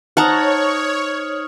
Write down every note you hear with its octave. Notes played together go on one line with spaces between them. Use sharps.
D#4 C5 C#5 F#5 A5 A#5 D#6 F6